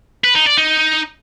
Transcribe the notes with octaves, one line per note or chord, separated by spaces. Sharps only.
B4
D#4
D5
D#4